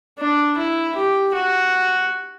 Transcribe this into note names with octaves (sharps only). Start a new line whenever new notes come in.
D4
E4
G4
F#4